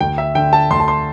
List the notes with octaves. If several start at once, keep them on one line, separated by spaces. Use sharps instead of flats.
D2 G5
E5
D3 G5
A5
D2 C6
A5
C6